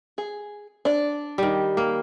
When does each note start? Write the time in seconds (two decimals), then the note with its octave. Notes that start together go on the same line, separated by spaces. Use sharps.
0.18 G#4
0.85 D4 D5
1.38 D#3 G3
1.77 A#3